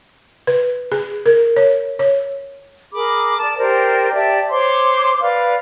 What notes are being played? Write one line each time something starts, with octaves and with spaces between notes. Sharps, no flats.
B4
G#4
A#4
C#5
C#5
G#4 A#4 B5 D6
D5 A5
G4 A#4 C5 D5
G4 D5 E5 A5
C5 C#5 C6 D6
B4 D5 F5